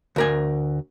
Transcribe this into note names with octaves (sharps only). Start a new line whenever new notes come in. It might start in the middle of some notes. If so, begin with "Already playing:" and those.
D2 A#4 G#5